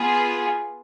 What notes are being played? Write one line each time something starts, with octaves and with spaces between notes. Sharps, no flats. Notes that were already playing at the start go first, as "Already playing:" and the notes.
Already playing: B3 F4 G#4